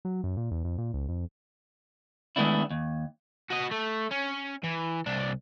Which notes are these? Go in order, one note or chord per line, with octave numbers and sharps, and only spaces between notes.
F#3
F#2
A#2
E2
F2
A#2
C#2
F2
D#3 G#3 A3 B3 D4 E4
D#2
F#4 D#5
A3
C#4
E3
C2 D4